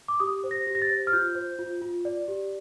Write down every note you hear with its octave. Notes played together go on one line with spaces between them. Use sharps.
D6
G4 D#6
C5
A#6
G4
A#6
A6
C5
F6
F4 G6
C5
F4
F4
D5
G4